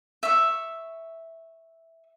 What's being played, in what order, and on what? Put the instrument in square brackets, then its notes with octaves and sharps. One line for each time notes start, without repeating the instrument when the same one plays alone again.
[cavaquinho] E5 C#6